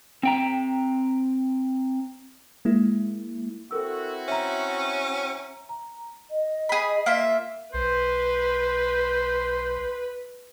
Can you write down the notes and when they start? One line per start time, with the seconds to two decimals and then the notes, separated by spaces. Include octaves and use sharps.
0.23 C4 G5 A#5
2.65 G#3 A#3 E4
3.71 C4 E4 F#4 A4 A#4 E6
4.28 C#4 E5 A#5
5.69 A#5
6.31 D#5
6.69 G#4 B5
7.06 A#3 F4 E5
7.74 B1 B4 C5